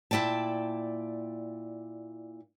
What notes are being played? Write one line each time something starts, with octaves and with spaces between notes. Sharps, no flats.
A#2 E4 D5 G5 A5